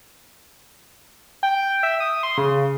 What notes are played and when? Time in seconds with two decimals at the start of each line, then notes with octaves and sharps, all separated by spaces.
1.43 G5
1.83 E5
2.00 D#6
2.23 C6
2.38 C#3